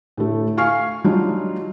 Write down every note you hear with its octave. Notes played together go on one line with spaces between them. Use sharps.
A2 D3 A3
F5 G#5 C#6 F6 C7
F#3 G3 D4 D#4 F4